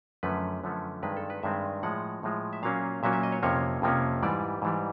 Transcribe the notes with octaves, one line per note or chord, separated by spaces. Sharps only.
F#2 D3 F3 A3 C#4 B4
F#2 D3 F3 A3 C#4
G2 D#3 G#3 C4 B4
A4
B4
G2 D#3 G#3 C4 E5
A2 F3 G#3 F#5
A2 F3 G#3
E5
A#2 F#3 A#3 C#4 F5
A#2 F#3 A#3 C#4 E5
E5
D#5
C#5
F2 C3 F3 A#3 C#4 C#5
F2 C3 F3 A#3 C#4
G#2 E3 G3 D5
G#2 E3 G3